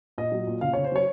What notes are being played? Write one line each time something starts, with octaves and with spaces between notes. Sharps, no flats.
A#2 D#5
F#3
A#2
C#3 F5
C#3 C#5
C5
F#3 C#5